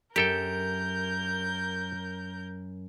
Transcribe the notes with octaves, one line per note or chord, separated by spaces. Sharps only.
F#2 G4 A4 A#4 G5 G6